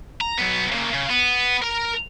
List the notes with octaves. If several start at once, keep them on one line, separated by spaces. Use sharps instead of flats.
A#5
F#3 B3
C#3 A#3
C#3
B3
A#4 A#5